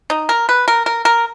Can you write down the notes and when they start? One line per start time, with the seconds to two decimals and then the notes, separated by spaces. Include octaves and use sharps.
0.10 D#4
0.29 A#4
0.49 B4
0.68 A#4
0.86 A#4
1.05 A#4